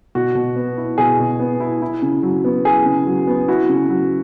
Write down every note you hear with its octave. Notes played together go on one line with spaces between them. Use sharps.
B2 F#4
B2
B3
E4
B2 G#4
B2
B3
E4
E4
C#3
F#3
B3
E4 G#4
C#3
F#3
B3
E4 F#4
C#3
F#3